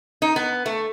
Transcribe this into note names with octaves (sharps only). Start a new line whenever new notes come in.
D#4
B3
A3